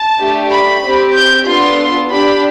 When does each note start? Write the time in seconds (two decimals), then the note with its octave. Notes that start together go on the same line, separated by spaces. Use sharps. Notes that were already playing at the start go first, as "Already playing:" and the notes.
Already playing: A5
0.18 A3 D4 G4
0.50 B5
0.82 C4 G4
1.14 G6
1.46 B3 D4 F4 A4 C6
2.10 D4 G4 B5